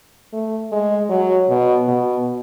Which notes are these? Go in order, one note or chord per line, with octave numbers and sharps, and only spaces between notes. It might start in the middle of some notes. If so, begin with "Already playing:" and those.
A3
G#3
F#3
B2
B2